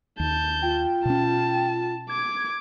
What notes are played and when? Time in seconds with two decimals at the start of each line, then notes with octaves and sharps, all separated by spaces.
0.20 D#2 A5 G6
0.62 F4 G5
1.05 B2 C#4 A5
2.09 D6 G#6